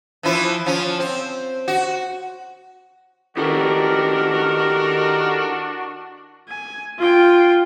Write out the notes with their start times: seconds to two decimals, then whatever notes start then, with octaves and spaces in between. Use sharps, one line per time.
0.23 E3 F3 E4
0.66 F3 C#4
1.00 C4
1.68 F#4
3.37 D#3 D4 E4 F#4 G4 A4 A#4
6.49 G#5
6.99 F4 G5